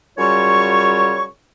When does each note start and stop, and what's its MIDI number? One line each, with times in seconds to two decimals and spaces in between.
0.18 1.24 42
0.18 1.24 49
0.18 1.24 55
0.18 1.24 65
0.18 1.24 73
0.18 1.24 85